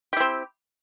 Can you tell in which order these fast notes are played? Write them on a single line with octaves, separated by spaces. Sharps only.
G4 E4 C4